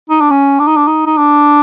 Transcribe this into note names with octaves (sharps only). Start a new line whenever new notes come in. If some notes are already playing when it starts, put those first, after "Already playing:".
D#4
D4
C#4
D4
D#4
D4
D#4
D#4
D4